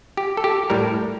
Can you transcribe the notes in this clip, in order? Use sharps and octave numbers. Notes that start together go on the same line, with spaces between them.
G4
A4
G4
A2 G3 A#4